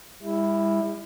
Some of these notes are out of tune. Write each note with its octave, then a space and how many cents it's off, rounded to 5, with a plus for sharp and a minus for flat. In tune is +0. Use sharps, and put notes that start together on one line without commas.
G3 +45 E4 +0